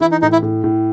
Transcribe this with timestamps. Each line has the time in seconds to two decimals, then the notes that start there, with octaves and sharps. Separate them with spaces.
0.01 E3 E4
0.12 D#4
0.22 A2 D#4
0.32 E4
0.42 A2
0.64 A2